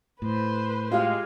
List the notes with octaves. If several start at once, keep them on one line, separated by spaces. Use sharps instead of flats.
A2 B4 C5
G#3 F4 G4 F5